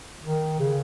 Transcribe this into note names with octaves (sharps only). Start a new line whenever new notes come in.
D#3
C#3